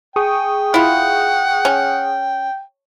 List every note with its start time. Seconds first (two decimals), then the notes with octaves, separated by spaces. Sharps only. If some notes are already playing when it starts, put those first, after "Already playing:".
0.16 G#4 G5 C#6 D#6
0.74 E4 F4 F#5
1.65 C#4